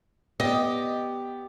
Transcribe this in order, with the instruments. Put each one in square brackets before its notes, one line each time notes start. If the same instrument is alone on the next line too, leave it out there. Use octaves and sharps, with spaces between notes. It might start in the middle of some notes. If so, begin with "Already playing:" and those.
[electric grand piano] B3 [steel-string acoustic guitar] G4 [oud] D#5